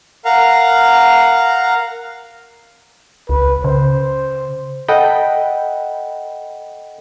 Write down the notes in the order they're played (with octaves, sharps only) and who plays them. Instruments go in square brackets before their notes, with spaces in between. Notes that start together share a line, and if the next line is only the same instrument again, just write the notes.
[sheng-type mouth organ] A#4 F5 F#5 A#5
[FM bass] C#2 [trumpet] B4
[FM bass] C#3 [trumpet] C5
[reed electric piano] A4 D#5 F#5 G5 B5